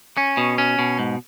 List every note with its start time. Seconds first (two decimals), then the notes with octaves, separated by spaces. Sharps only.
0.17 C#4
0.37 B2
0.58 C#4
0.79 B2
0.99 G#2